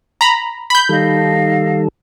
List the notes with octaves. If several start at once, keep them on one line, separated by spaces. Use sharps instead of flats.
A#5 B5
B5 G6
D#3 G3 D#4 A4 F5 A5